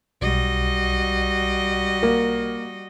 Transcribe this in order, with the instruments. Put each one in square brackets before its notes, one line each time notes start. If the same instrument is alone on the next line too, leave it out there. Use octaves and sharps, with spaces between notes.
[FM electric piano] B1 [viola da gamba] G3 F#4 D#5
[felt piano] A#3